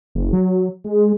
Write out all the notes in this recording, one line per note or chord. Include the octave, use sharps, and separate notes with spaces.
F#1
F#3
G#3